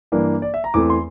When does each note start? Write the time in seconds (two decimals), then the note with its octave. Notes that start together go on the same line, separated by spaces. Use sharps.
0.12 G2 E3 A#3 D4
0.42 D5
0.54 E5
0.64 A#5
0.74 E2 E3 A3 C4 D6
0.90 C6